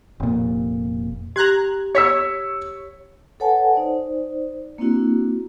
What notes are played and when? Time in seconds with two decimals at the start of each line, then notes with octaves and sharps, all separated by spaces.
0.20 F1 A#2
1.36 G4 A#5 F#6 G#6
1.95 C#5 E6 B6 C#7
3.40 A4 B4 C#5 F#5 G#5 A5
3.73 D#4 C5 D5
4.78 A#3 C4 D4 E4 F#4